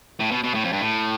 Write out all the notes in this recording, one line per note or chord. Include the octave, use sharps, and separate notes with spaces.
A2
B2
B2
A2
F2
G2
A2